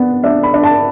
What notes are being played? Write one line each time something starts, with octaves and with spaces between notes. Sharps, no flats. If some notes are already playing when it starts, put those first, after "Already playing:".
Already playing: B3 D4
D4 E5
B5
D4
A5